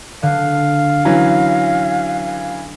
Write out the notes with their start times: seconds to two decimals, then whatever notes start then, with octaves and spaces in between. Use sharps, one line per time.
0.23 D3 F5
1.05 E3 F#3 C#4